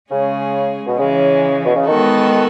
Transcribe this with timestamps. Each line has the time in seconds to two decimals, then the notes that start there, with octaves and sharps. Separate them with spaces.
0.10 C#3 G#3 C#4 G#4
0.87 B2
0.99 C#3 E3 G#3 C#4
1.64 B2
1.75 C#3
1.86 D#3 G#3 B3 F#4 A4